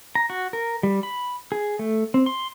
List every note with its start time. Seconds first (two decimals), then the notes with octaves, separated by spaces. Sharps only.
0.15 A#5
0.30 F#4
0.53 A#4
0.83 G3
1.03 B5
1.52 G#4
1.79 A3
2.14 C4
2.26 C6